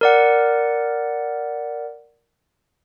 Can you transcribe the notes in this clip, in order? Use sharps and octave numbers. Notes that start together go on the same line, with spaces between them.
A#4 D5 F#5